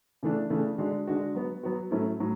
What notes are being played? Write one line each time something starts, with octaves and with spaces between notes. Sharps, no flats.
C#3 E3 A3 D4
C#3 E3 A3 D4
D3 G#3 D4 F#4
D3 G#3 D4 F#4
F#3 B3 F#4
F#3 B3 F#4
A2 F#3 A3 C#4 E4
A2 F#3